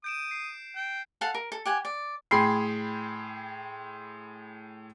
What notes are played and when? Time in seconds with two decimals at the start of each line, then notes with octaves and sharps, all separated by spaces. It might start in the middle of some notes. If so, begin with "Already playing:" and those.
0.04 D#6 G6 D7 E7
0.31 C7
0.76 G5
1.21 A4 F5 F#5 A5
1.35 A#4
1.52 A4
1.66 G4 F#5 G#5
1.85 D5
2.31 A2 G#4 G5 B5 C6 C7